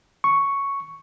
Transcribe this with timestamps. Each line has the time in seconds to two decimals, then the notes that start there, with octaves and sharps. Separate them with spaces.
0.24 C#6